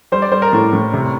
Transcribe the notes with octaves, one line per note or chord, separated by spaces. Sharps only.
G3 C5
D5
G3 C5
A#4
A2
A2
C3